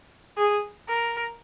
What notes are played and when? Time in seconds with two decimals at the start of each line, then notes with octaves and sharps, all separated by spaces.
0.38 G#4
0.88 A#4